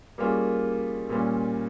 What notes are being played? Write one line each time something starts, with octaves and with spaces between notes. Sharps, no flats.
G3 A#3 C#4 F4 G#4
A#2 G3 C#4 F4